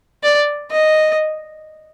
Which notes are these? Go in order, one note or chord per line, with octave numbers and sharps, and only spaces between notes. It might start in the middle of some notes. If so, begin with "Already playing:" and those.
D5
D#5